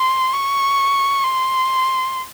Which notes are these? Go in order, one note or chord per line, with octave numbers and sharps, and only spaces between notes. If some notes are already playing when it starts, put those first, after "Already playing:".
Already playing: C6
C#6
C6